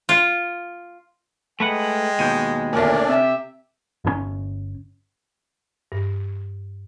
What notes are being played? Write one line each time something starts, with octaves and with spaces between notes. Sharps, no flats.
F4
G#3 A3 B4 F#5 G5
D#2 B2 G6 D#7
D2 A#2 C#4 D4 D5
C3 G4 E5
G1 C#3 C#4
G2